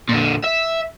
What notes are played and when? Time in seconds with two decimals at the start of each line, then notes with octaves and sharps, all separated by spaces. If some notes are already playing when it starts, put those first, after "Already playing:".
0.09 A#2 D3
0.44 E5